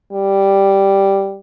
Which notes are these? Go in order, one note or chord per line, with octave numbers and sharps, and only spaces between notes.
G3